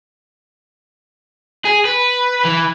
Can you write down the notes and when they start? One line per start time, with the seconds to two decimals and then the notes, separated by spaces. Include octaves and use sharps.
1.65 G#4
1.85 B4
2.45 E3